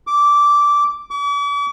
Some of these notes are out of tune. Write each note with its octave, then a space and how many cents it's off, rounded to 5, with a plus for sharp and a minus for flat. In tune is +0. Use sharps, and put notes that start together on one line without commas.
D6 -10
D6 -45